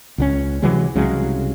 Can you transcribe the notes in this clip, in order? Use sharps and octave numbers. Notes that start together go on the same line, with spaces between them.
C#2 F#3 C#4
C3 E3 F#3 G#3
C2 C#3 F#3 G#3